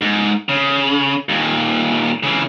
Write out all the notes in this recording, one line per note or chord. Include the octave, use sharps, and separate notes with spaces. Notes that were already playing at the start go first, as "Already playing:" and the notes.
G#2
C#3
D#2 A#2
C#3 E3